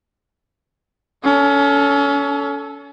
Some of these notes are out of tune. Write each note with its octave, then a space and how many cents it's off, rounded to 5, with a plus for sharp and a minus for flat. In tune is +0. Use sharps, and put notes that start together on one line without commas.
C#4 +30 A4 +0